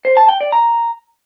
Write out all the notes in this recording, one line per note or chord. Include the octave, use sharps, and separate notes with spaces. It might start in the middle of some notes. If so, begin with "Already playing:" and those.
C5
A5
G5
D5
A#5